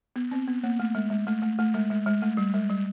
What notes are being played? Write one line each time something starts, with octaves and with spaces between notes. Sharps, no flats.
B3
C4
B3
A#3
A3
G#3
G#3
A3
A3
A3
G#3
G#3
G#3
A3
G3
G#3
G3